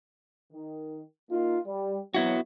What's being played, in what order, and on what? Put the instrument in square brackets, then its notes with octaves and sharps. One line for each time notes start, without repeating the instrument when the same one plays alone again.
[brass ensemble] D#3
A#3 D#4 F4
G3
[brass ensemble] F2 F#3 [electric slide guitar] B3 E4 F#4